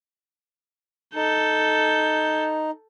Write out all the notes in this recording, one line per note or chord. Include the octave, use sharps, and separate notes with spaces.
D#4 A4 G6